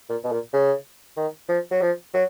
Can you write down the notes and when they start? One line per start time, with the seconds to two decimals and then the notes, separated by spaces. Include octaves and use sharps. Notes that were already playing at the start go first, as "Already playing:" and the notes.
0.09 A#2
0.24 B2
0.32 A#2
0.53 C#3
1.17 D#3
1.49 F3
1.71 F#3
1.81 F3
2.14 F#3